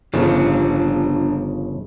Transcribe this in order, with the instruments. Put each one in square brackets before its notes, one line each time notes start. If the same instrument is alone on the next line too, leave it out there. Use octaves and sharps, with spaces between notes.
[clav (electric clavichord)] G1 C#3 F3 [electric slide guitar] D4 F4